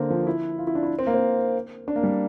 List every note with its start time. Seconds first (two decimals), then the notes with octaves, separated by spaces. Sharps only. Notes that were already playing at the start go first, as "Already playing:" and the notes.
Already playing: D3 A#3 C4
0.10 F3
0.27 E4
0.58 F4
0.67 E4
0.75 D4
0.83 E4
0.99 C4
1.07 A#3
1.14 C4
1.88 D4
1.96 A#3
2.03 G3